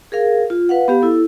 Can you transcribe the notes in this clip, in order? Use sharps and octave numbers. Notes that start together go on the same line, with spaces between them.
G#4 A#4 F5
F4
B4 F5 F#5
B3 G4 F5
E4 A4